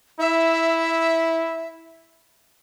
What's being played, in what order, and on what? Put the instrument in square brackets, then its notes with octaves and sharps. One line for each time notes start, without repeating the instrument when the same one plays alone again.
[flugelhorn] E4 [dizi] E5